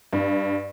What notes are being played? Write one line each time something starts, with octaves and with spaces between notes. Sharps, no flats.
G2